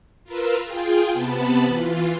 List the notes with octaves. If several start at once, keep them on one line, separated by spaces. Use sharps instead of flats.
F4 A#4 B4 E6
F4 G#4 G5
C3 B3 A5 B5
E3 F4